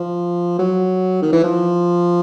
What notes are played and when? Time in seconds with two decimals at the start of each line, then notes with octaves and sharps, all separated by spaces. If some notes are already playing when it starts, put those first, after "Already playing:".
Already playing: F3
0.59 F#3
1.22 D#3
1.33 E3
1.44 F3